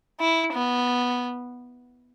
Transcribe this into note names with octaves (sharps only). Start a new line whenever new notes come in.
E4
B3